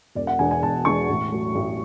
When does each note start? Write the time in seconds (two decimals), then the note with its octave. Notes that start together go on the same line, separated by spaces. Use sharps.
0.15 E1 D5
0.27 F#5
0.39 E2 B2 G#3 D4 G#5
0.51 G#5
0.62 E1 A5
0.85 E2 B2 G#3 D4 C#6
1.09 A1
1.32 A2 F#3
1.55 A1